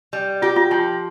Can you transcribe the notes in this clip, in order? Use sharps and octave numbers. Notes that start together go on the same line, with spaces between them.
G3
F4 G4
F4
F3 F4